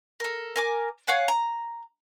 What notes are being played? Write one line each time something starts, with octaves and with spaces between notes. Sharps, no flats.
A4 A#4
A#4 G#5 D6
C#5 F5 F#5 G#5
A#5